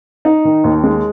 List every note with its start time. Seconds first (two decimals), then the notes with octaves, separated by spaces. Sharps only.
0.25 D#4
0.45 D#3
0.64 D#2
0.84 G#3